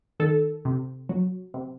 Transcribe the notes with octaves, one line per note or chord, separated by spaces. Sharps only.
D#3 A4
C3
F#3
C3